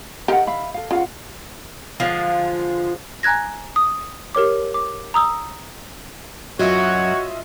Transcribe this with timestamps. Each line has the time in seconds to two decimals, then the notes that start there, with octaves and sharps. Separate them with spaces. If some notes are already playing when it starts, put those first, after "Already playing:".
0.28 D#3 G4 A4 A#4 F5 F#5
0.47 E5 F5 B5
0.74 A4 F5
0.91 C#3 F4 F5 F#5
2.00 D3 F3 G#3 F4
3.23 G#5 A#5 F#6 G#6 A#6
3.76 D#6
4.35 G4 A#4 C#5 D6
4.74 D6
5.14 A#5 D#6 E6
6.59 F#2 F#3 F4 F#4 C#5 D#5 E5